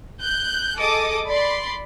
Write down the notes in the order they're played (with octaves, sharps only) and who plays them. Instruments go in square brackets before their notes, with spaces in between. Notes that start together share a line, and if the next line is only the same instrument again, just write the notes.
[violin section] F#6 G6
G#4 A4 D#5 D6 D#6
D5 B5 C6